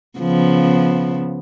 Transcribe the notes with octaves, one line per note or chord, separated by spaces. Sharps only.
C#3 F3 B3